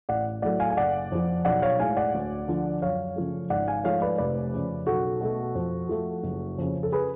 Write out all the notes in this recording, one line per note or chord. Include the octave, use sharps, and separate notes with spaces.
A1 D5 F#5
A2 F#3 A3 D5 F#5
F5 G#5
G#5
F#1 D5 F#5
F2 F3
B1 D5 F#5
C#5 F5
A2 G#3 F5 G#5
D5 F#5
D2
D3 F3
F#2 C#5 F5
C#3 F3 A3
G#1 D5 F#5
F5 G#5
G#2 F3 A3 C#5 F5
B4 D5
F1 B4 D5
F2 C#3
B1 F#4 A4
B2 A3
F2
F3 A3
F#1
F2 C#3
A4
G#4 B4